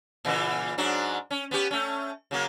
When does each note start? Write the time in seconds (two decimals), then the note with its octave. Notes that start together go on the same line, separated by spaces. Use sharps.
0.25 A#2 C#3 E3
0.78 G#2 F#3 D4
1.30 C#4
1.51 B3 C#4 G4
1.71 A3 C#4
2.31 C#3 F#3 A#3